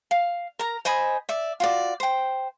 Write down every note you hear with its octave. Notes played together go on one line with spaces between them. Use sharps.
F5
A#4 A#5
C5 D#5 G#5 B5
D5 E5
F4 F#4 D5
C5 G5